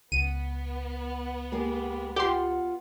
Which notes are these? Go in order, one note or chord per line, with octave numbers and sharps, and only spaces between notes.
C#2 B3 D#7
G#3 A#3 G4
F4 G4 F#5 C6